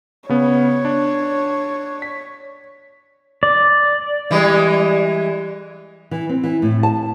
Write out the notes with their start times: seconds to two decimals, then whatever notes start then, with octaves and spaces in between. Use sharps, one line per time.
0.29 C#3 B3 C#5
0.85 D4
2.02 B6
3.43 D5
4.31 E3 G3 G#3
6.11 E3
6.29 C4
6.44 E3
6.62 A2
6.83 A5